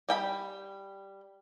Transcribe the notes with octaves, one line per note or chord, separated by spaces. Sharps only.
G3 G5 B5